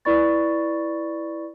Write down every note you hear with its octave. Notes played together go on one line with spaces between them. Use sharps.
E4 B4 D5 B5 C#6 A6